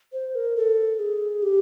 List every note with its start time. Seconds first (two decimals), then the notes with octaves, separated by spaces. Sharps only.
0.13 C5
0.35 A#4
0.56 A4
0.99 G#4
1.43 G4